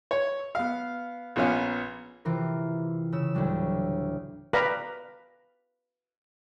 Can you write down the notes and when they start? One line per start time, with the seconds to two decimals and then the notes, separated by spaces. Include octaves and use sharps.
0.11 C#5
0.55 B3 F5
1.36 A#1 A#3 B3 C#4 F5
2.25 C3 E3 F4 A#4
3.12 C#3 E6
3.35 D2 A2 F#3 G3
4.53 B4 D5 F5 G5 A#5 B5